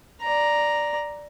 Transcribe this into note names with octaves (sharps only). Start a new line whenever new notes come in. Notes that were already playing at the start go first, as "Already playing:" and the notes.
D5 A#5